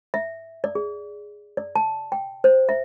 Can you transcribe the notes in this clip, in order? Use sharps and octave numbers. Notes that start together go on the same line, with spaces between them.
E5
D5
G#4
D5
A5
G5
C5
E5